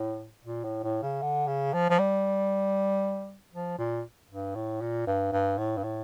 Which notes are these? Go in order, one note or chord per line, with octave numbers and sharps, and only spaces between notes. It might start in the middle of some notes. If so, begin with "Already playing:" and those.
Already playing: A2
A#2
A2
A2
C#3
D3
C#3
F3
F3
G3
F3
A#2
G2
A2
A#2
G2
G2
A2
G2
A2